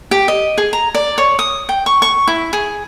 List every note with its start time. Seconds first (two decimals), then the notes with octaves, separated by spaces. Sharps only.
0.11 G4
0.28 D#5
0.58 G#4
0.73 A#5
0.95 D5
1.18 C#5
1.39 D#6
1.69 G5
1.86 C#6
2.02 C#6
2.27 E4
2.53 G#4